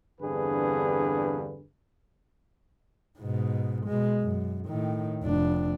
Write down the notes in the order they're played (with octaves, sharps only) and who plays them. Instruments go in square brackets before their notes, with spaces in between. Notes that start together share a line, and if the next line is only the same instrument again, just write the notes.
[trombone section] E2 G2 D3 C4 G#4 B4
[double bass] G#2 B2
B2 G#3
F#2
A2 D#3
F1 D4